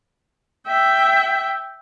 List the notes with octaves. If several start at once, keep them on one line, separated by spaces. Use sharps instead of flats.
E5 G5